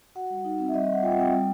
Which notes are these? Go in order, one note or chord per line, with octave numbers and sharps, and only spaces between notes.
F#4 F#5
G3
D#4
C4
E5
G3 D#5
G3 D#5
F#5
F4 G5
F#5
C4 G5
G3